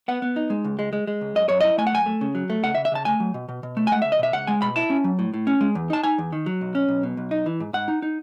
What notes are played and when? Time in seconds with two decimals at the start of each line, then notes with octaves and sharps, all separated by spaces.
0.08 B3 F#5
0.22 B3
0.36 D#4
0.50 G#3
0.64 C#2
0.79 G#3
0.93 G#3
1.07 G#3
1.21 C#2
1.35 F#2 D#5
1.49 F#2 C#5
1.61 E4 D#5
1.78 A3 G#5
1.87 F#5
1.92 F#2 G#5
2.06 A3
2.21 C#3
2.35 F#3
2.50 A3
2.63 C#2 F#5
2.75 E5
2.77 C#3
2.85 E5
2.92 C#3 A5
3.05 A3 G#5
3.20 F#3
3.34 B2
3.49 B2
3.63 B2
3.77 A3
3.87 G#5
3.91 G#3 F#5
4.02 C#2 E5
4.12 D#5
4.19 B2 E5
4.33 C#2 F#5
4.47 G#3 G#5
4.62 B2 B5
4.76 E4 A5
4.90 C#4
5.04 F#3
5.19 A2
5.34 A2
5.47 C#4
5.61 G#3
5.75 E2
5.90 D#4 A5
6.04 D#4 G#5
6.18 E2
6.33 D#3
6.46 F#3
6.61 B1
6.75 C#4
6.89 B1
7.03 B2
7.17 B1
7.31 D#4
7.46 E3
7.60 G#2
7.73 G#2 F#5
7.88 D#4
8.02 D#4